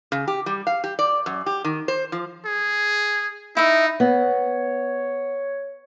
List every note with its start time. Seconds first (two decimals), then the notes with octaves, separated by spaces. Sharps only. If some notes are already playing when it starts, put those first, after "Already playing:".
0.12 C#3
0.28 G4
0.46 G3
0.67 F5
0.84 G4
0.99 D5
1.26 F#2
1.46 G4
1.64 D#3
1.88 C5
2.12 F3
2.46 G#4
3.57 D#4 E4 E5
4.00 B3 C#5